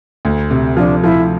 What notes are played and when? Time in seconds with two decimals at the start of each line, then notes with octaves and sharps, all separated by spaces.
0.25 D2
0.51 C3
0.77 F3 D4
1.03 F3 E4